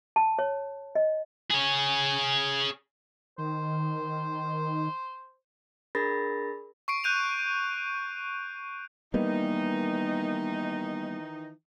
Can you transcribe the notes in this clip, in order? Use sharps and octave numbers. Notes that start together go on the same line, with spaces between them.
A5
C#5
D#5
G#4 C#5
D#3 C5
D4 G#4 A#4 B5 A6 A#6
C#6 C7 D7
F#6 G6 D#7 F7
D#3 E3 G3 A#3 B3 D#4